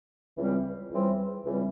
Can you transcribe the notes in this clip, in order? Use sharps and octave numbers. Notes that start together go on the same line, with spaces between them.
C#2 C#3 E3 G3 C4
C#2 C#3 E3 G3 C4
C#2 C#3 E3 G3 C4